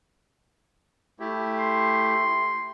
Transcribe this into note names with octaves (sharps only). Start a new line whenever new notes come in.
A3 E4 G4
C6